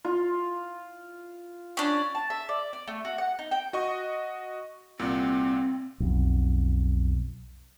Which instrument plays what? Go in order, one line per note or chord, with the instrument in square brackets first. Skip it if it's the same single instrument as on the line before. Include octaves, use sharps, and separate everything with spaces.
[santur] F4
[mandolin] C#4 D4
A5
E5
D5
D5
A3
F#4
F#5
D#4
G5
[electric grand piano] F#4 D#5 C#6
[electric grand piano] C2 A#2 [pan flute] C4
[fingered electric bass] B1 F2